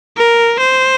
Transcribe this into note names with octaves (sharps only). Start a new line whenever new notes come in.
A#4
C5